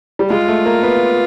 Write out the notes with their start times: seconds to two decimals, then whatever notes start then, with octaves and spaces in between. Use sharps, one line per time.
0.19 G3
0.30 G#3 F4
0.48 A3
0.66 A#3
0.83 B3